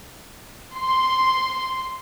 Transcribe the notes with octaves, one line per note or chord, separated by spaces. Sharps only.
C6